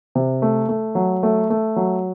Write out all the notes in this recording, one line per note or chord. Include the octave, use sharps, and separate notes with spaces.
C3
A3
A3
F#3
A3
A3
F#3